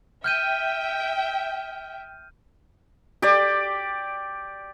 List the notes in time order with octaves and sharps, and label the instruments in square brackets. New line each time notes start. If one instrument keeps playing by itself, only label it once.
[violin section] E5 G5 [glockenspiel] F6 G6 D#7
[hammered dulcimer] G4 D5